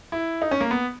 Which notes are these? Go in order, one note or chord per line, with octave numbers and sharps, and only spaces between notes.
E4
D#4
C#4
A#3
B3